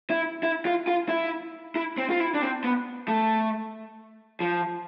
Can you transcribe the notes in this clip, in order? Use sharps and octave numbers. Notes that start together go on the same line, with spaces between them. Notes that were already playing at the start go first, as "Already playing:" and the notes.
E4
E4
F4
F4
E4
E4
C4
F4
E4
D4
C4
B3
A3
F3